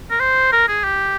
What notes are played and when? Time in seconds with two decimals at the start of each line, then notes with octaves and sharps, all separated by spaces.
0.11 A#4
0.20 C5
0.52 A#4
0.68 G#4
0.84 G4